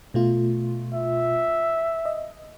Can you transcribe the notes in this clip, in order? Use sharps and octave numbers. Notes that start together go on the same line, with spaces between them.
B2 A3 F4
E5
D#5